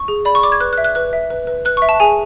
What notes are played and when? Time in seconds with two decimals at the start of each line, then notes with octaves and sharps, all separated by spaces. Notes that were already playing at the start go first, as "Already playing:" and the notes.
Already playing: C#6
0.08 G#4
0.25 D5 B5
0.35 C#6
0.43 D5 D6
0.52 G#6
0.60 B4 F#6
0.73 F#6
0.78 E5
0.84 F#6
0.95 B4 F#6
1.13 E5
1.30 B4
1.47 B4
1.65 B4 F#6
1.77 E5 C#6
1.89 A5
2.00 G#4 G#5